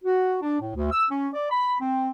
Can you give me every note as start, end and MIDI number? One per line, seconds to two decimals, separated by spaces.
0.03 0.37 66
0.42 0.59 62
0.61 0.72 45
0.74 0.90 38
0.91 1.04 88
1.10 1.28 61
1.33 1.47 74
1.50 1.75 83
1.81 2.09 60